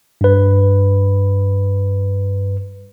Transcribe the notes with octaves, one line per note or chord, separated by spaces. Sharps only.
G2 B4